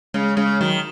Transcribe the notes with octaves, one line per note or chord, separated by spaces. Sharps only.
C#3 G#3
C#3 G#3
D#3 F#3